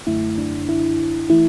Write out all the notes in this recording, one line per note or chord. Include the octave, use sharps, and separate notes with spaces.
F#2 D3 A3 E4
D4
E4
E3 A3 E4